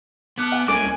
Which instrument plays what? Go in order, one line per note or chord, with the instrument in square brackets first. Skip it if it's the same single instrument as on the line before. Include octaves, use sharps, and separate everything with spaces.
[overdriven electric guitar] B3 [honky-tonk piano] A5 F6 F#6 [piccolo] D6
[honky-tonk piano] E5 F#5 G#5
[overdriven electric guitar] C2 C#3 [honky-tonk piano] A3 A#3 [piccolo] G#5 [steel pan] D6